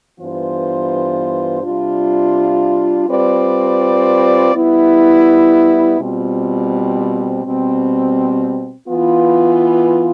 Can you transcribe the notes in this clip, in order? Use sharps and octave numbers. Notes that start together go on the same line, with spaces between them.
G2 E3 B3 F4 C5
C3 G3 D4 F4
G3 C4 F4 B4 D5
G3 B3 E4
B2 G3 C4 F4
B2 G3 C4
E3 B3 F4